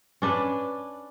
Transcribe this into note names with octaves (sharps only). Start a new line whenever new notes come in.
C#4 D4 B4